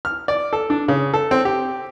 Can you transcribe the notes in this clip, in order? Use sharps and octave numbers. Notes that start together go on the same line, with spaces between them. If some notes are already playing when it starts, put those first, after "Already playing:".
F6
D5
A4
D4
C#3
A4
C4
G4